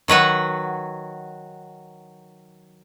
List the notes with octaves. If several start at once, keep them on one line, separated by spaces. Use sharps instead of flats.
D#3 F#3 B4 F#5